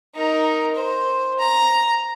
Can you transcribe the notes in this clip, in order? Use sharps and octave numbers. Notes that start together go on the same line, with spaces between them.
D#4 A#4
C5
A#5